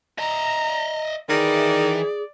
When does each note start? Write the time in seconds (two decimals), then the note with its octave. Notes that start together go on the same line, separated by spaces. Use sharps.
0.19 D#5 E5 A#5
1.29 D#3 E3 G#4 D5